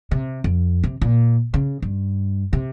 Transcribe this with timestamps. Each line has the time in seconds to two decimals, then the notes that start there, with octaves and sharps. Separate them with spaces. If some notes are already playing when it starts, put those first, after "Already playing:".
0.11 C3
0.44 F2
0.84 C3
1.02 A#2
1.54 C#3
1.82 G2
2.53 C3